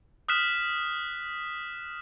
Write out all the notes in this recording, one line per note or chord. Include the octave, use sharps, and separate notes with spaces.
D#6 F6 F#6 B6 E7